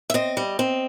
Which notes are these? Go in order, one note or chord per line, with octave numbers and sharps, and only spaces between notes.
E5
C4 D#5
G3
C4